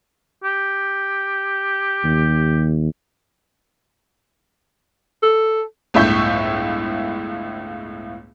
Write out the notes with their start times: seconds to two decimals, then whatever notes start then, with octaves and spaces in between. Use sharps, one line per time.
0.44 G4
2.04 D#2
5.23 A4
5.94 G1 C#2 A2 E5 C#6 G6